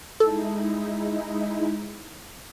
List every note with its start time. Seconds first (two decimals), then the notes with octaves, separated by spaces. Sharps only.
0.20 G#3 D#4 E4 A4